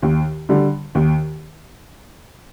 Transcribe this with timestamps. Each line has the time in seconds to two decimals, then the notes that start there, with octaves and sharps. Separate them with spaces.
0.02 D#2
0.49 D3 G3
0.95 D#2